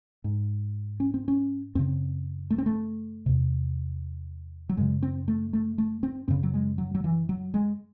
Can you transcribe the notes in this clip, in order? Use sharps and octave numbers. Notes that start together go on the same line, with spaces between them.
G#2
C#4
C4
C#4
F#2 C#3 C4
A3
C4
A3
E2 C3
F#3
F#2 C#3 G#3
C4
A3
A3
A3
C4
F#2 C#3 C4
F#3
G#3
F#3
F#3
E3
F#3
G#3